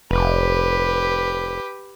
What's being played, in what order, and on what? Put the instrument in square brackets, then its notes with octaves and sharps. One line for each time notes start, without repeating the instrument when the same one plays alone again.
[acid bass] F1 [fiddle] G4 B4